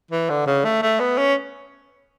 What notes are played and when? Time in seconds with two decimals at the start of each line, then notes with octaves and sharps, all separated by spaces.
0.11 E3
0.30 D3
0.47 C#3
0.64 A3
0.82 A3
1.00 B3
1.18 C#4